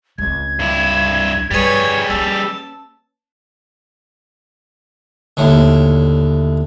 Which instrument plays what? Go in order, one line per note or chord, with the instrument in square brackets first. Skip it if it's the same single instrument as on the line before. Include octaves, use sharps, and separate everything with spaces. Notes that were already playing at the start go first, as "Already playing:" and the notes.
[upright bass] C#2 C4 [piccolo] G#6
[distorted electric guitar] G2 E4
[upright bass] G2 [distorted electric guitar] G3 G#4 [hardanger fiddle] B4 C#5
[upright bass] A#3 C#4 [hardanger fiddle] A5 [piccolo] E6
[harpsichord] D#2 A2 D3